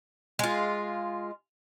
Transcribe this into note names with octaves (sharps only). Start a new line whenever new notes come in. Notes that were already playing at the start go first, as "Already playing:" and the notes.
G#3 F4